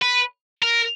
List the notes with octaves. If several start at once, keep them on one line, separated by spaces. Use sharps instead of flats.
B4
A#4